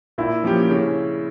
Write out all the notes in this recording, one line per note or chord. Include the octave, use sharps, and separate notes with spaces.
A#2 E4
F3 A#3 C#4 G4
C#3 C#4